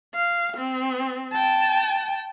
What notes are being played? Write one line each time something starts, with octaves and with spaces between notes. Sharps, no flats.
F5
C4
G5 A5